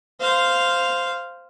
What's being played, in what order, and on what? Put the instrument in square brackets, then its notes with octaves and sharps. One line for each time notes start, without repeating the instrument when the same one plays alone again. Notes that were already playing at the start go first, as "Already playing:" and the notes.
[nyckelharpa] C5 F5